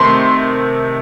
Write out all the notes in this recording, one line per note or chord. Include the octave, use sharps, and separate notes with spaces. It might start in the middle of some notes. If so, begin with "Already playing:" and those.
Already playing: C3 D#3 A3 C6